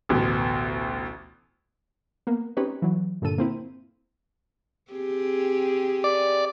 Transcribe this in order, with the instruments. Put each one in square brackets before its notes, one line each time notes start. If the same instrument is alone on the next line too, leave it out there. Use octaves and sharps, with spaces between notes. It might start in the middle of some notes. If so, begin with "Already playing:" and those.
[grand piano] A1 D2 B2
[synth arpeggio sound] A#3 B3
C4 C#4 D#4 G4 B4 C#5
E3 F#3
G2 A#2 D3 A4 D#7
A#3 C4 E4
[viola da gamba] C4 G4 G#4
[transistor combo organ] D5